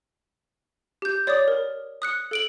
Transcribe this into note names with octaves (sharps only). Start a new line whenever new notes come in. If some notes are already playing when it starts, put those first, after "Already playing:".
G4 G6
C#5 D5 D6 D#6
A#4
D#6 F#6 C#7
A4 D7 F#7